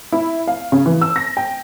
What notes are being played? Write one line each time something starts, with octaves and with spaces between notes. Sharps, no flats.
E4
F5
C#3
E3
E6
A#6
G5